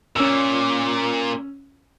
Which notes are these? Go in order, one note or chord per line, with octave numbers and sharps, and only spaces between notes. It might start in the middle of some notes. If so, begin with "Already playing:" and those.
A#2 C#4 E6